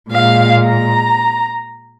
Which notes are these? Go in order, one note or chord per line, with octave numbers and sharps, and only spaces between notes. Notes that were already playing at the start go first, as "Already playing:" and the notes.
A#2 G#3 F5
A#5